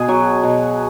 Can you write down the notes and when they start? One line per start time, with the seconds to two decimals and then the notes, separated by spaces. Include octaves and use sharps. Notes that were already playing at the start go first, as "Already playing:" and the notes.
Already playing: B2 G#4
0.09 F#3
0.44 B2